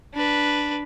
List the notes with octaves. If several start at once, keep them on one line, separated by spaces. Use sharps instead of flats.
D4 B4